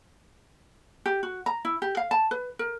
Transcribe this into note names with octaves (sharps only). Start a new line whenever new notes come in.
G4
F#4
A#5
E4
G4
F5
A5
B4
A#4